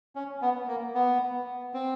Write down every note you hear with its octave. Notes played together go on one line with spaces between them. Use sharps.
C#4
B3
A#3
B3
C4